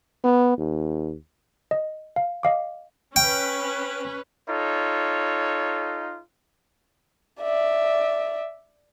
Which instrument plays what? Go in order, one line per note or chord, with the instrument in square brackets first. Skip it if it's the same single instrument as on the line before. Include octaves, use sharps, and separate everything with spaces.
[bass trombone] B3
D#2
[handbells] D#5
F5
D#5 F5 D6
[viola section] C#4 B4 [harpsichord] G5
[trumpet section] D#4 F4 A4 C#5
[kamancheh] D5 E5